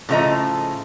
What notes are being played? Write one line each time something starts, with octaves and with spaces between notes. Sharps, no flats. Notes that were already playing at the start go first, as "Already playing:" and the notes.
A2 C#3 F3 A3 D#5 A#5